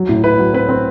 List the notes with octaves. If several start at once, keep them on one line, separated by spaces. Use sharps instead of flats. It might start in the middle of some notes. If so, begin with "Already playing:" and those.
Already playing: F#3
A2
E4 B4
F#3
C4 B4
C4